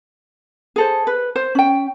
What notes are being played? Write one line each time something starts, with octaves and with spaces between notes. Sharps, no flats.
G#4 A4 C5
B4
C5
C#4 G5